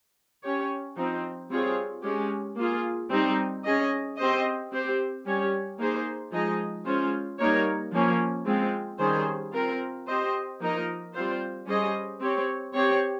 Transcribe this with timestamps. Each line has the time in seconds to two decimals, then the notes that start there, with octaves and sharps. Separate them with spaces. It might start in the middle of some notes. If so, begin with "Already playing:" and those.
0.44 C#4 G4 C#5
0.97 F3 C4 D#4
1.50 G3 C4 F4 G#4 C#5
2.03 G#3 C#4 G4
2.57 A#3 F4 G#4
3.10 G3 C4 D#4
3.64 C#4 G#4 D#5
4.18 C4 G4 C5 D#5
4.72 C4 G4 C5
5.25 G3 C#4 G4 C#5
5.79 A#3 D#4 G#4 C5
6.32 F3 G#3 D#4 G#4 D#5
6.86 G#3 C#4 F4 C5
7.38 G3 A#3 D#4 A#4 C#5
7.92 F3 A#3 C#4
8.46 G#3 C4 F4
8.99 D#3 G3 C#4 G#4 C5
9.53 C4 F4 A#4
10.07 C4 G4 C5 D#5
10.60 F3 A#3 D#4 A#4 D#5
11.14 G3 C4 F4 C5
11.67 G3 C#4 G#4 C5 D#5
12.20 C4 G4 C#5
12.74 C4 G4 C#5